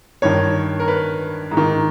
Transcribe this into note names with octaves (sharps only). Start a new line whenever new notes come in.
G2 D#3 C#5
A#4
B4
G#2
D#3